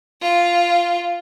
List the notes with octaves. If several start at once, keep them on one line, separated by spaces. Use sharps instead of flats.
F4